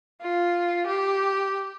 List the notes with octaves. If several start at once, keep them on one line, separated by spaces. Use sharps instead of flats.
F4
G4